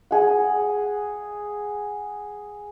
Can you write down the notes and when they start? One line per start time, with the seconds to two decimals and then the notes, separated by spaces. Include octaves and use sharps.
0.11 G#4 F#5